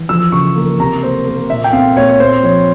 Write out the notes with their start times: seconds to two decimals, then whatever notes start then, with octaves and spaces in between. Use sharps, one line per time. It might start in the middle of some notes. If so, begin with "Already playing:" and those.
Already playing: E3
0.09 F3 E6
0.32 C#3 C#6
0.56 A#3
0.80 C3 A#5
1.03 A#3 C5
1.26 A#3
1.50 A#2 E5
1.64 G5
1.73 C4 F5
1.96 A#2 C#5
2.09 C#5
2.20 C4 C5
2.43 F3 C#5